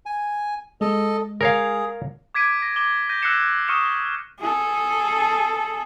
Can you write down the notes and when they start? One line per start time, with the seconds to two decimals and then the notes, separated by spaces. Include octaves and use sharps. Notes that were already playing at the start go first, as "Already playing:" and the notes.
0.06 G#5
0.81 G#3 A4 D#5
1.41 G#4 A#4 C#5 F5
2.35 D6 G#6 B6 D7 D#7
2.60 A#6 D7
2.76 D6 G7
3.09 G6 A#6 D#7
3.22 E6 F#6 A#6 C7 C#7 E7
3.68 C#6 D#6 F6 C#7 E7
4.40 G#4 A4